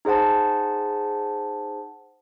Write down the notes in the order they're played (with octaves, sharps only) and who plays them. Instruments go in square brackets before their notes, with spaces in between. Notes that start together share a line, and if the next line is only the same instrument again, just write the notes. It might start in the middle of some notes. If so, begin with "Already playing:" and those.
[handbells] D#4 G#4 C5 F#5 A5